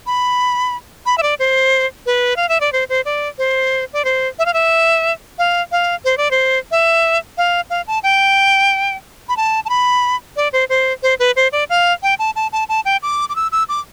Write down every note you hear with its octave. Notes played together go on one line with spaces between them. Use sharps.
B5
B5
E5
D5
C5
B4
F5
E5
D5
C5
C5
D5
C5
D5
C5
E5
F5
E5
F5
F5
C5
D5
C5
E5
F5
F5
A5
G5
B5
A5
A5
B5
D5
C5
C5
C5
B4
C5
D5
F5
G5
A5
A5
A5
A5
G5
D6
D6
E6
E6
D6